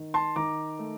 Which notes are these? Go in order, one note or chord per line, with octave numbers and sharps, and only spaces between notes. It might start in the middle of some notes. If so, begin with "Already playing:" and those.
Already playing: D#3
A5 C6
D#3 A#5 D6
A3